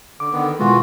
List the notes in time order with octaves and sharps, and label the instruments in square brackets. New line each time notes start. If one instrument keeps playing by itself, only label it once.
[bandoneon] D3 [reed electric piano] D6
[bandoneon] D3 D#3 B3
[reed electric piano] B2 G#3 [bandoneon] E3 F4 F#4